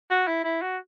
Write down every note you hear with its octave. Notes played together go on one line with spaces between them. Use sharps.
F#4
E4
E4
F#4